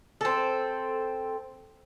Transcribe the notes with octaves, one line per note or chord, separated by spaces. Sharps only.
C4 A4